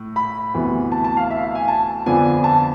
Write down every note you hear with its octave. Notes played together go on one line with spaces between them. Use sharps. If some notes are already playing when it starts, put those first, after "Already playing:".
Already playing: A2
B5
D2 C3 E3 B3
A5
A5
F5
E5
F5
G#5
A5
F2 D3 F3 B3 D4 G#5
A5